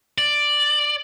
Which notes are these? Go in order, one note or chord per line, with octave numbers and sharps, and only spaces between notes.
D5